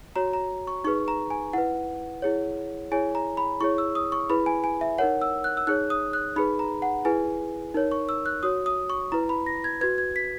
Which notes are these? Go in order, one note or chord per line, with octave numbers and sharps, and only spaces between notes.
F#4 C#5 A#5
A#5
C#6
D#4 G#4 B4 C#6
A#5
G#5
E4 B4 F#5
E4 G#4 C#5
E4 G#4 C#5 G#5
A#5
B5
E4 G#4 C#5 C#6
E6
D#6
C#6
E4 G#4 B4 B5
G#5
G#5
E5
D#4 A#4 C#5 F#5
E6
F#6
E6
D#4 G#4 C#5 F#6
D#6
F#6
D#4 G#4 B4 B5
A#5
F#5
E4 G#4 B4 G#5
D#4 A#4 C#5
C#6
E6
F#6
F#4 C#5 D#6
D#6
C#6
E4 B4 A#5
B5
A#6
G#6
F#4 B4 G#6
G#6
B6